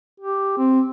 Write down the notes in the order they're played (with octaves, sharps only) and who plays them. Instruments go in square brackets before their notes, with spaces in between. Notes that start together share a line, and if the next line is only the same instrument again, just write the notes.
[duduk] G4
C4